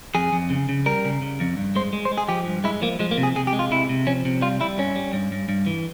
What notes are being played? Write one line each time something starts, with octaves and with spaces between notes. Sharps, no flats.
F2 G#4
F2
C#3
C#3
G3 A#4
C#3
C#3
F2
G2
G#3 C5
G#3
C5
G#3
G#4
F3 G4
G2
G#3 E4
F3 A#3
F3 G#3
A#3
C3
G#4
C3 G#4
G4
G#3
F4
C3 E4
C3
F3 C#4
C3
G3 F4
G3 E4
G2 C#4
G3
G2
G2
G2
E3